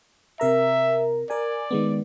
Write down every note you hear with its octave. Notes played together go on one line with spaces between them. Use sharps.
C3 A#4 E5 A#5
A#4 D5 G#5
D#3 G#3 B3